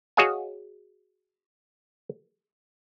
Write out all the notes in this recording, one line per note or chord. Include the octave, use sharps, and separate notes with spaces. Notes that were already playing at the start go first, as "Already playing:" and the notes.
F#4 G#4 C#5 D#5 F5 G#5